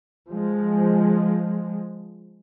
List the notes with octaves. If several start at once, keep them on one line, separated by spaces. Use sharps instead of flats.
F3 G#3